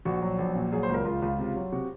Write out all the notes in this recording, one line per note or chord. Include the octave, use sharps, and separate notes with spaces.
A#1 F#4
F#3
A#1
A#2
F#3 G#4
C5
C#2
A#4
C#2 F4
C#2 F4
C3
F#3
C3 F#4